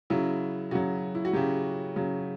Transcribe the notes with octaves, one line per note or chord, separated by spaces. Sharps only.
C#3 F#3 E4
C#3 F#3 F#4
E4
F#4
C#3 F#3 G4
C#3 F#3